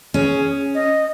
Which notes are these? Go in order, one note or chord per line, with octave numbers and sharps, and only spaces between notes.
C#4 G#4
D#5